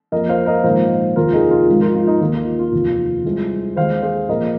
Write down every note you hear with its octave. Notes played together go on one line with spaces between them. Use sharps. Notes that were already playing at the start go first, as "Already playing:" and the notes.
F2 F3 A#3 A#4 D#5
C5 F5
A#4 D#5
A#1 G#2 D#3 A#3 C5 F5
F1 D#2 D#3 G#3 F4 A#4
D#4 G#4
F4
G#1 G#2 F3 G#3 F4
F4 A#4
F4
D#4
D#2 D#3 A#3 F4
F4
F4
F1 D#2 D#3
C2 C3 G#3
D#2 D#3 G#3 C5 F5
G#4 C5
A#1 A#2 A#3 A#4 D#5